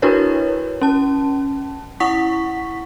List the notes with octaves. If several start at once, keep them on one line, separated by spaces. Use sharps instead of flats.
D4 E4 F#4 A#4 B4 C#5
C#4 A5
E4 F#5 C#6 B6